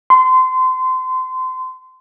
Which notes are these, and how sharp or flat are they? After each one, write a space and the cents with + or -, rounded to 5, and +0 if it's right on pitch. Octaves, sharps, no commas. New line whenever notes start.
C6 -25